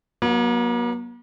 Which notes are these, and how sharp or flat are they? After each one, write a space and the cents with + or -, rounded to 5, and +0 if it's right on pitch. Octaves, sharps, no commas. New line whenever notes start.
F#3 +0 A#3 +45